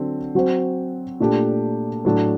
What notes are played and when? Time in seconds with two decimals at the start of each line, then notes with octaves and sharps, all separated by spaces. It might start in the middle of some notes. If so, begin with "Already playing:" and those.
Already playing: D3 F#3 C4
0.35 F#3 C4 F#4 C5
1.20 A#2 A3 D4 G4
2.05 A2 F#3 A3 D4